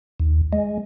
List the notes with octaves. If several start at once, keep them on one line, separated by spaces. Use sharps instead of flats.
D#2
G#3